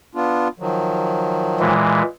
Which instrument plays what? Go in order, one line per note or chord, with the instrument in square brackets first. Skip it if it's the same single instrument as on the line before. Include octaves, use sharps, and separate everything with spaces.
[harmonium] B3 D4 F4
D#3 F3 F#3
[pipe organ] A#2 E3 G#3